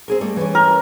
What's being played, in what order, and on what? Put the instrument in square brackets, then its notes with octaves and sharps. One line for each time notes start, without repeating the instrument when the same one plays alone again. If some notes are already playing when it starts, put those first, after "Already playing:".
[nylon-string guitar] C4 G#4 A#4
G3 A3 A#3
E3 C#4
[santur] A#4